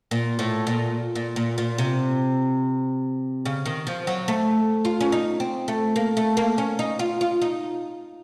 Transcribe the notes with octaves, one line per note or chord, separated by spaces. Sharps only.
A#2
A2
A#2
A#2
A#2
A#2
C3
C#3
D#3
F3
F#3
A3
F4
C#4
D#4
C4
A3
A#3
A3
A#3
C#4
D#4
F4
F4
D#4